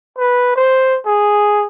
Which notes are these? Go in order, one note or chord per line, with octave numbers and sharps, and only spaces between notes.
B4
C5
G#4